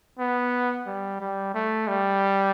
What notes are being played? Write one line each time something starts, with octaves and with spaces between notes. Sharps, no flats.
B3
G3
G3
A3
G3